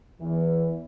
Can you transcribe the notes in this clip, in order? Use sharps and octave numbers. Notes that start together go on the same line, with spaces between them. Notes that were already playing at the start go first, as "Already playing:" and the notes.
E2 E3